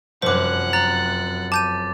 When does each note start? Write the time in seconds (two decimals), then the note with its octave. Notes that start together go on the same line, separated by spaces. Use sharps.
0.22 F1 F#2 C5 F#5 D6 F#6
0.73 A#5 A6
1.52 A5 D6 G6 D#7